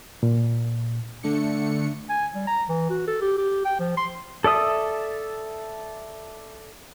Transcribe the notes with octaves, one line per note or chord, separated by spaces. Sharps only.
A#2
D3 A3 D4 C#7
G#5
G3
A#5
E3
F#4
A4
G4
G4
G5
F3
C6
A4 D5 E5 D#6